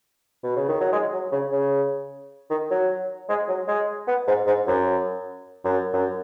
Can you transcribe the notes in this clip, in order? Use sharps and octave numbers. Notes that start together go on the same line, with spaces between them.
B2
C#3
D#3
F#3
G#3
F#3
C#3
C#3
D#3
F#3
G#3
F#3
G#3
B3
G#2
G#2
F#2
F#2
F#2